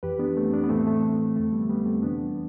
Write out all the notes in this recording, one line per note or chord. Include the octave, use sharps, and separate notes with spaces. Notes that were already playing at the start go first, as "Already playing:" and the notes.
F2 E3 G4 B4
B3 D4
A3 C4
B3 D4
B3
A2 E3 A3 C4
A3
F2 D3 A3
G3 B3
G3 B3
A3 C4
E2 C3 E3 B3 D4